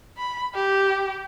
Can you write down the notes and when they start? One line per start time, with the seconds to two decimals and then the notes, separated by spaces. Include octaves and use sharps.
0.18 B5
0.55 G4